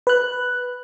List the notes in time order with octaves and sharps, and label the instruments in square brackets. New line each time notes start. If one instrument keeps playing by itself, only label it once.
[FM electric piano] B4 F#6